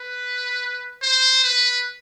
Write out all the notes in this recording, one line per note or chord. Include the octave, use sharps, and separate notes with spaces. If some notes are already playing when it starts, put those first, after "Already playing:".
Already playing: B4
C5
B4